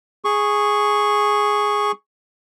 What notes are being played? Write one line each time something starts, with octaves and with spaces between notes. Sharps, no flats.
G#4 C#6